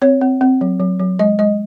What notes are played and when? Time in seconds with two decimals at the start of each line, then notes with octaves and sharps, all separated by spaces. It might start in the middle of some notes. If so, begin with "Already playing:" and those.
0.02 C4 C#5
0.21 C4
0.41 C4
0.61 F#3
0.80 F#3
1.00 F#3
1.19 G#3 D#5
1.39 G#3 D#5